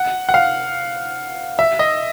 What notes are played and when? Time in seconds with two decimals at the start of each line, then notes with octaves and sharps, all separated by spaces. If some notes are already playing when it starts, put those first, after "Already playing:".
Already playing: F#5
0.29 F#5
0.34 F5
1.59 E5
1.79 D#5